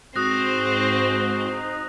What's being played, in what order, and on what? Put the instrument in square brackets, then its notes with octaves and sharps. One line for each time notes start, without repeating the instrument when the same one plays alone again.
[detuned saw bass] G#2 [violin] C4 C5 [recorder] F#4 [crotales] D#6 F#6 A#6
[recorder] D#4